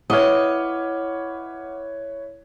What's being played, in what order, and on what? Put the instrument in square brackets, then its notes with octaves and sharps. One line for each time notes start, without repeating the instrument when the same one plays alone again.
[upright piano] E4 B4 C#5 [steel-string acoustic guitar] D#5 [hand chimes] F#5 D6 F6